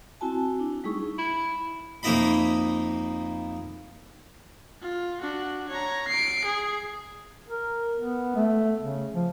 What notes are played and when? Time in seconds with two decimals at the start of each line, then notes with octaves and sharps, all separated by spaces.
0.21 C4 E4 F#4 G#5 A5
0.59 D4 E4
0.84 G3 A3 D#4 E4 G#4 C#6
1.18 E4
2.03 F2 A#3 D#4 E4 D#5 B5
4.82 F4
5.21 D4 F#4
5.69 C#5 A#5
6.08 C7 D7
6.45 G#4
7.48 A#4
7.97 B3
8.36 A3
8.81 C#3
9.14 F3